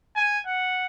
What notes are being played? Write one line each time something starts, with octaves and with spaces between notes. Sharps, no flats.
G#5
F#5